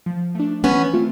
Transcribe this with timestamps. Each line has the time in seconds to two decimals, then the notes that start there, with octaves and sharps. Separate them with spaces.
0.06 F3
0.35 A3 D4
0.64 E3 B3 C#4
0.94 A3 C4 F4